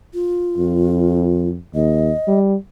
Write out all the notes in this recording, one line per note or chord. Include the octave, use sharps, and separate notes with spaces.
F4
F2
D#2 D#5
G3